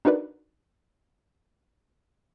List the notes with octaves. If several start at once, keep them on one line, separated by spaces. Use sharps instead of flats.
D4 D#4 F#4 A#4 B4 D5